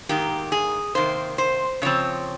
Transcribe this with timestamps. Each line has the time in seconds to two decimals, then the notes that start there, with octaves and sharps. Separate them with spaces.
0.09 G#2 D#3 A#3 G4
0.52 G#4
0.95 C3 D#3 A#3 C5
1.38 C5
1.82 C#3 F3 C4 C#5